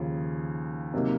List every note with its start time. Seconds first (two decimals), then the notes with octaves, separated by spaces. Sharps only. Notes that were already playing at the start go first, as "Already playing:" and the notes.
Already playing: D#2 C#3 F3
0.94 C3 F#3 A#3 D#4